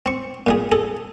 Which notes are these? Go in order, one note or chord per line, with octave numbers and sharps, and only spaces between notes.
C4 C#6
A#2 G3 G#4
G#4 A4